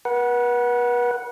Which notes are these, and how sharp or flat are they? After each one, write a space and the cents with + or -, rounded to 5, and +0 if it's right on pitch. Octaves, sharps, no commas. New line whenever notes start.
B4 -40 F#5 +0